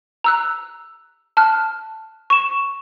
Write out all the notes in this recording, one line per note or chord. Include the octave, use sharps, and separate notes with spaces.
A#5 E6 F#6
A5 F6 F#6
C#6 E7